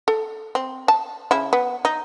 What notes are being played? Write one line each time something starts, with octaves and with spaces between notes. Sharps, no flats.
A4
C4
A5
C#3 E4
B3
D#4